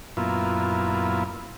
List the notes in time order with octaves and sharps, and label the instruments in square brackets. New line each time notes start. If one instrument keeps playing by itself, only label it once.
[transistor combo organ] F#2 A#2 B3 E4 F4